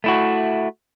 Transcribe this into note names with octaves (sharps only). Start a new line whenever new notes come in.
A3 E4 F#4